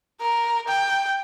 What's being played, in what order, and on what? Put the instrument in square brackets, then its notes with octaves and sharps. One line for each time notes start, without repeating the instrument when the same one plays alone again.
[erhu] A#4
G5